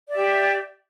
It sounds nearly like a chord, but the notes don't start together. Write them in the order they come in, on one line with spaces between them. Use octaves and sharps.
D5 E5 G4